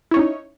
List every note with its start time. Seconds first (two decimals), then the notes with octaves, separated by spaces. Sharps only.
0.11 E4
0.14 C#5
0.17 C#4
0.19 D#4